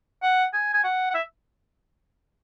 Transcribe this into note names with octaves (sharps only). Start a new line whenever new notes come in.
F#5
G#5
G#5
F#5
F#5
E5